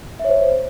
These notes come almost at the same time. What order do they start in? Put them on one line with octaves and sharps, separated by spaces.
E5 C#5 C5